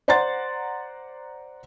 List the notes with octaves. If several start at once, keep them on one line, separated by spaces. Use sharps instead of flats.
C5 D5 F#5 A#5 C6 A6